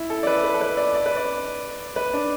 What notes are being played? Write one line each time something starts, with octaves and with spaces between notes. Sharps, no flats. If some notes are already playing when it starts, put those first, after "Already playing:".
Already playing: E4
A4
D5
B4
B4
A4
B4
D5
D5
B4
D5
B4
D4